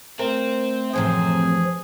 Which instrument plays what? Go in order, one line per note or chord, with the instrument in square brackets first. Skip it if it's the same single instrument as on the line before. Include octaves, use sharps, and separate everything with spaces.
[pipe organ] A3 [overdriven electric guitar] C4 [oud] A#4
[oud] F#2 A2 C3 [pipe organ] E3 F3 [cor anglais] G#4